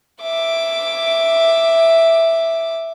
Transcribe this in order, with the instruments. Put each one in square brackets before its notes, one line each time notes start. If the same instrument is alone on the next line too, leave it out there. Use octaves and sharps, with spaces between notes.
[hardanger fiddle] E5 D6